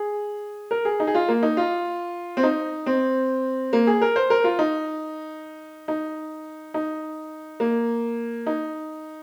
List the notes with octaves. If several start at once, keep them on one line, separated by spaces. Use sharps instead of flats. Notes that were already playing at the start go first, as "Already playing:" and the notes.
Already playing: G#4
A#4
G#4
D#4
G#4
F4
A#3
D#4
F4
C4
D#4
C4
A#3
G#4
A#4
C5
A#4
F4
D#4
D#4
D#4
A#3
D#4